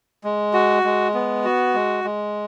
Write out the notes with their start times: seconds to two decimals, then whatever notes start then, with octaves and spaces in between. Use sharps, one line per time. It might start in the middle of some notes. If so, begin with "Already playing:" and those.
0.24 G#3
0.54 F#4
0.84 G#3
1.14 B3
1.44 F#4
1.74 G#3
2.04 G#3